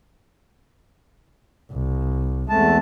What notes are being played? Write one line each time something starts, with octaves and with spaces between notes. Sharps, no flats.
C2
E2 G#3 A3 C4 A5